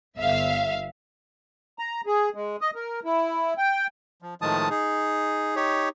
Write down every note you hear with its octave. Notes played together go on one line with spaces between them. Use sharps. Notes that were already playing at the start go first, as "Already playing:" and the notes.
G1 E5 F5
A#5
G#4
G#3
D#5
A#4
E4
G5
F3
A2 D#3 F3 G#3 A5 D#6
D#4 G#4
D#4 G4 C#5